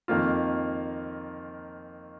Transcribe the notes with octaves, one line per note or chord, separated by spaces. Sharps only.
F2 D#3 A#3 F4